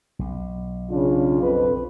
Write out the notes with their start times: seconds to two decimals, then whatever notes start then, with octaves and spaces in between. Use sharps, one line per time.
0.19 B1
0.90 C#3 D4 F4
1.41 F2 B4